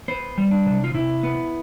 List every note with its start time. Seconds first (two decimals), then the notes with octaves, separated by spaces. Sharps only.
0.08 B3 C5
0.38 G3
0.51 D4
0.66 C3
0.84 F4
0.94 C3 E4
1.23 B3